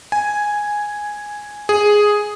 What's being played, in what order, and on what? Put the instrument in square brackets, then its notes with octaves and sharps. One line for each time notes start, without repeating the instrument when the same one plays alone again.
[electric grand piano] G#5
G#4